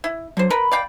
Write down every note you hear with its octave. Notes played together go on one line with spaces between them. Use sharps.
E4
D3 F#3 C5
A#4 B4 B5
D5 F5 G5